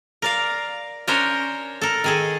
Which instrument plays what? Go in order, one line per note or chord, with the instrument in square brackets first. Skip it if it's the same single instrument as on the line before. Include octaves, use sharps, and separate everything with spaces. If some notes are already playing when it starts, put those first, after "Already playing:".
[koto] A#4 D5 F5
C#4 D4 A#4 C5 C#5
A4 A#4
D#3 G#4 A4